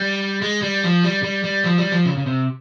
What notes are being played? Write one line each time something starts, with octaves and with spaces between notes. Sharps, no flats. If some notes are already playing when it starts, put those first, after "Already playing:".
Already playing: G3
G#3
G3
F3
G3
G3
G3
F3
G3
F3
C#3
C#3
C3